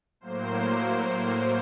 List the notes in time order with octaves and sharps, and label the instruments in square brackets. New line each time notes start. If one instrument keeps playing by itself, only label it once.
[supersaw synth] A2 F#3 A#3 C5